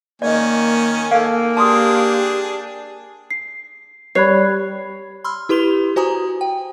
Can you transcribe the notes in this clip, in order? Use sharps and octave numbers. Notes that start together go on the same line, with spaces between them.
D#3 A#3 C#4 D5 D#5 G#5
A#3 A4 F5
D4 G4 G#4 A5 C6 D#6
C7
G3 C#5 B5 F#6 C7
B5 C6 E6 F6
E4 G4 B4 C6 F7 G7
F#4 C5 G#5 A#5 D#6
G5